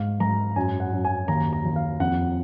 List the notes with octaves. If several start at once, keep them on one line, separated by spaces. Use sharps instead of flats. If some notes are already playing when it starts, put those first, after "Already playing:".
Already playing: G#2 F5
G#2 A#5
F#2 G#5
F#5
F#2
G#5
D#2 A#5
A#5
D#2
F5
F2 F#5